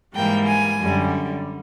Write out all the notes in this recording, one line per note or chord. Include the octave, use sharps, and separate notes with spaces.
G#2 E3 G3 A#3 G5
G#5
F#2 D3 G3